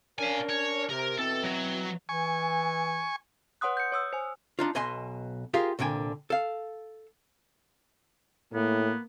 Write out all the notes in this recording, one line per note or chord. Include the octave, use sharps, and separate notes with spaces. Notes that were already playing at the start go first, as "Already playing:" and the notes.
C#4 D4 A#4 F5 G#5
C#5
C3 A#4
B2 E3 C4 A4
F#3 F#4
E3 G#5 C#6
B4 C#5 F#5 C6 D#6 F#6
G6 C#7
C#5 D#6 E6
C5 G#5
D4 D#4 F4
B1 B2 D#5 G#5 C6
F4 G4 G#4 A#4 F5
C2 A#2 D3 G5 G#5
A4 F5
A2 A#3 B3